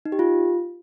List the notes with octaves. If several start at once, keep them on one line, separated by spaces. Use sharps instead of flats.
D#4
G4
F4